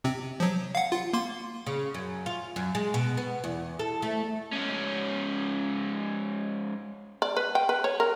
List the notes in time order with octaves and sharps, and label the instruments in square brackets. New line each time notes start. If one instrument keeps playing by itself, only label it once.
[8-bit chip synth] C3 C4
F3 F#3
F5 F#5
F4
A#3 C6
[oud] C#3
F#2
F4
F#2
G#3
B2
B3
E2
A4
A3
[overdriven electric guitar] G#2 C#4
[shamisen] D5
B4
G5
B4
C#5
A#4